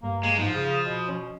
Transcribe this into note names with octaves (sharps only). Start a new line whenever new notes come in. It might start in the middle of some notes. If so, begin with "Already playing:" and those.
G2 A#3
G#3 A#3
G#2 F3
C#3 D#6
B2
C#4